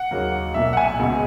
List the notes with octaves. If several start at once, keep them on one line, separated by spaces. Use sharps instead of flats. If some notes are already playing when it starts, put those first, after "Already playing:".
Already playing: F#5
D#2 C#3 F#3 A#3
B1 A#2 A#3 E5
F#5
E5 G#5
C#2 B2 G#3